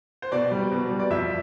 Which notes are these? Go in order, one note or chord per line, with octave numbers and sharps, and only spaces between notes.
C5
B2 D5
G3
B2
G3
D5
F2 E5